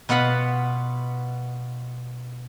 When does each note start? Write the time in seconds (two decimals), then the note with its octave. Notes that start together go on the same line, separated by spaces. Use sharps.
0.09 B2 B3 F4 F#5 B5